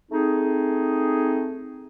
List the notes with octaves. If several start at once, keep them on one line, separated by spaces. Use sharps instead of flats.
A3 C4 D#4 G#4